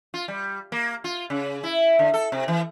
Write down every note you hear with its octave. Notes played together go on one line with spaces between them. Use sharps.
F4
G3
A#3
F4
C#3
E4
D3
A4
C3
E3